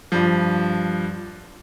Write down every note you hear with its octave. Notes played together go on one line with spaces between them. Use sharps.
G2 F3